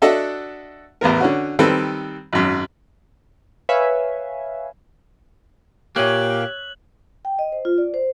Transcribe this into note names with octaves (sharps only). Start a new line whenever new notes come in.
D4 F#4 A4 D#5 E5 F#5
A1 E2 B3 A#4
D3 C#4 F#4
D#3 G3 C4 A4 B4
G#1 F#2
B4 C#5 E5 F5 G#5
A#2 A#3 G4 C#5 E5 F#6 F#7
G5
D#5
C5
F4
D5
C5